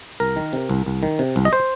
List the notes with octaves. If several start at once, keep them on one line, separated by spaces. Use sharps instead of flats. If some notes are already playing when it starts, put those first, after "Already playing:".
C2 A#4
D#3
C3
C2
C2
D#3
C3
C2
D#5
C5